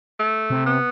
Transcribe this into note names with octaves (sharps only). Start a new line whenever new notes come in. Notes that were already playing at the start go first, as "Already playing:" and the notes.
A3
C3
B3